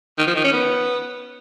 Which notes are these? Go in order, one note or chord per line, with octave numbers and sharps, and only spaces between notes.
D#3
F3
D#3
C#4
B3